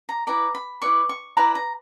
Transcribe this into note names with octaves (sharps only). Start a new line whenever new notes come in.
A#5
E4 B4 D5 A#5
B5
E4 B4 D5 C#6
C#6
E4 B4 D5 A#5
A#5